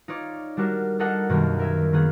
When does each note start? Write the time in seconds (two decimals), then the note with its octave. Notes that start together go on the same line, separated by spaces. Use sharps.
0.08 D#4 F4 C#5 D5
0.57 G3 D4 F#4 A#4
0.99 D4 D#4 A4 A#4 D#5 F#5
1.29 F#2 B2 D#3 G3 A#3
1.59 A#4 E5 G#5
1.93 D#3 A#3 B3 G#4